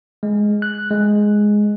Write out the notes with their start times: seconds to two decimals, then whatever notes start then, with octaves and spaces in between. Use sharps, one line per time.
0.23 G#3
0.62 F#6
0.91 G#3